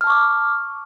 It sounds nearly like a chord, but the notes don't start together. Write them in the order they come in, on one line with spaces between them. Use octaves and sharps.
F6 A5 C#6 D6